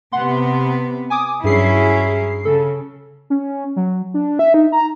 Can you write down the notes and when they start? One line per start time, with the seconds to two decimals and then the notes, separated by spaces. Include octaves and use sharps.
0.12 C3 B3 F#5 C6
1.10 G#5 D6 D#6
1.44 G2 F#3 C#4 E4 G#4 C7
2.45 C#3 A4
3.30 C#4
3.76 F#3
4.14 D4
4.39 E5
4.54 D#4
4.72 A#5